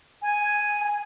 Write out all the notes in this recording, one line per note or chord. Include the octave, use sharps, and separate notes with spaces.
G#5
G#5